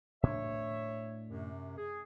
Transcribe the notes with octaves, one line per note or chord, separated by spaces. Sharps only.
A2 D4 C#5 E5
F#2 C3
G#4